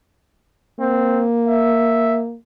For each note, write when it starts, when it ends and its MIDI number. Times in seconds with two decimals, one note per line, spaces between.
0.80 2.36 58
0.80 1.25 60
1.47 2.21 76